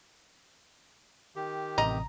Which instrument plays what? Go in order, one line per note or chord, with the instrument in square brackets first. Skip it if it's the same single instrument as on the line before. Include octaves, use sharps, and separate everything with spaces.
[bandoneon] D#3 G4
[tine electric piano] A1 C3 [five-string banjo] D#5 [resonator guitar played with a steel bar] A#5